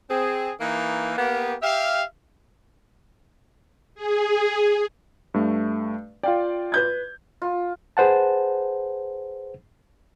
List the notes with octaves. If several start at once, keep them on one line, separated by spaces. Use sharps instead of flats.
C4 G#4
E3 A#3 D#4
A#3 B3 G4
G4 E5 F5
G#4
G2 A3
F4 D5 F5 G5
B4 G6 G#6
F4
G#4 B4 C5 F#5 A5